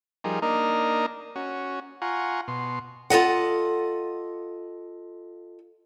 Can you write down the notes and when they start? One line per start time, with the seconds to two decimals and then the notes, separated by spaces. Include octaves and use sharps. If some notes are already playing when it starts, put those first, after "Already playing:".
0.24 F3 G3 D#4 G#4 A#4
0.42 A#3 D4 D#4 A#4 D#5 A#5
1.36 C#4 F#4
2.02 F4 F#5 G#5 A#5 C#6
2.48 B2 C6
3.10 F4 A4 D#5 F#5